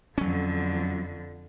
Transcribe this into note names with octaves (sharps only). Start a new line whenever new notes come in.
F2 D3 F#3 C#4